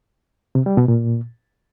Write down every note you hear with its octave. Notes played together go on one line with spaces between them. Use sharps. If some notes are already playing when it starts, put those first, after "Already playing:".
C3
G3
B2
A#2